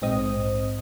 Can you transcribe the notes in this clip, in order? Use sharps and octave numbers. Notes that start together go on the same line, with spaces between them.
A#1 G#2 C4 D#5 D#6